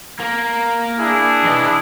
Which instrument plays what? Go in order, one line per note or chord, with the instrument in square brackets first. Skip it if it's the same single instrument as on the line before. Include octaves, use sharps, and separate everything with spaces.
[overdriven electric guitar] A#3 A#4
[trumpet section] D4 E4 G#4
[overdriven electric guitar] E3 D#5